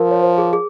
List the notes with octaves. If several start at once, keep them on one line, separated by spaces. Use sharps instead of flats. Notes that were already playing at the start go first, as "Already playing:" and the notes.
Already playing: F3 A#4
C#5
C5
G#4
G#4